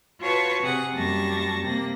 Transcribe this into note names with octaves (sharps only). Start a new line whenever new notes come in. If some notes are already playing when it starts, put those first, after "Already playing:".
F4 F#4 B4 C#5 A5 C#6
C3 G#4 F#5
F#2 G3 A#3 A5 C#6 A#6
C3 A#3 A#6